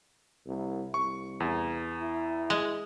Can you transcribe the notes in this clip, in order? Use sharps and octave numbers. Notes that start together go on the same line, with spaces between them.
C2
C2 C#6
E2
E4
G#3